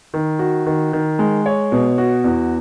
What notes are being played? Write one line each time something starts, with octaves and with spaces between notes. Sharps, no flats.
D#3
F#4
D#3
D#3
G#3
C#5
B2
F#4
E2